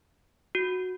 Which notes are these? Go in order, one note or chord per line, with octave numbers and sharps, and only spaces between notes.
F#4